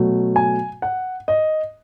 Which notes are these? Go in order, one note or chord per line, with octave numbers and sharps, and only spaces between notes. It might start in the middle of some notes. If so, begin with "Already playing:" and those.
Already playing: B2 F#3 A3
G#5
F#5
D#5